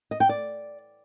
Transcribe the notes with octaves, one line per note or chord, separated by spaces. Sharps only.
D#5
G5
D5